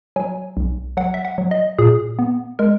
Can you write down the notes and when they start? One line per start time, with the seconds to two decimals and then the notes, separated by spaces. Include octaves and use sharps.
0.16 F#3 G#5
0.57 B1
0.97 F#3 F#5
1.14 E5
1.25 F#5
1.38 F#3
1.51 D#5
1.79 A#2 G#4
2.19 B3
2.59 G#3 A#4